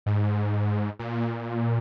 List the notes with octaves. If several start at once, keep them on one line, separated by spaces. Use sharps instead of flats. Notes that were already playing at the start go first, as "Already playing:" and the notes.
G#2
A#2